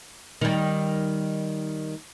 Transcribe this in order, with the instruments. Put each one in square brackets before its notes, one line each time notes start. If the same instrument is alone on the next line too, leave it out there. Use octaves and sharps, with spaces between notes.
[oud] D#3 G3